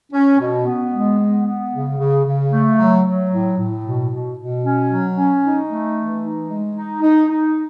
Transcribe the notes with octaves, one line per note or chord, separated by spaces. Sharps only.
C#4
B2
B3
G#3
B3
B3
C#3
C#3
C#3
A3
F#3
F#3
A2
A2
B2
B2
B2
C#4
F#3
C#4
D#4
A3
E3
D#4
G#3
D#4
D#4
D#4